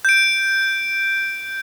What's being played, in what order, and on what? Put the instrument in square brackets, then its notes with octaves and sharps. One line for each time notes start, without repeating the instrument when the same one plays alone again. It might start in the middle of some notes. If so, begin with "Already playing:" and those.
[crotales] G6 D7